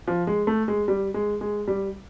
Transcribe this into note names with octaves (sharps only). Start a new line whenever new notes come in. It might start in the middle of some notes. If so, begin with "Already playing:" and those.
F3
G#3
A3
G#3
G3
G#3
G#3
G3